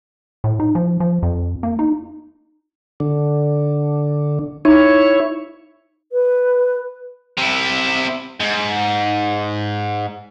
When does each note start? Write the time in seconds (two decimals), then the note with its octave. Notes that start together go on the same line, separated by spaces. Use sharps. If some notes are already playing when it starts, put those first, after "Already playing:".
0.44 A2
0.60 D#4
0.75 F3
1.00 F3
1.23 F2
1.63 A#3
1.79 D#4
3.00 D3
4.65 D#4 E4 C#5
6.12 B4
7.38 C3 E4
8.40 G#2